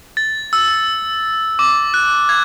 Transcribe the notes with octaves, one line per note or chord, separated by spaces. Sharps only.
A6
E6
D6
F#6
G#6